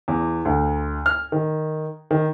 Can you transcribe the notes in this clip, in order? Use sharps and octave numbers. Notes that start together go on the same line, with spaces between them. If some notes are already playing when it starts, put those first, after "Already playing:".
E2
D2
F6
D#3
D#3